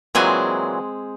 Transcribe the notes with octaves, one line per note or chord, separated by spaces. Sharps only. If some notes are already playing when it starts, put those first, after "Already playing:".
A#2 E3 F#3 G#3 C4 G#5